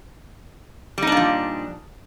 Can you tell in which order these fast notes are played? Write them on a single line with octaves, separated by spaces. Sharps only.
G3 D#4 D4 A#2 F3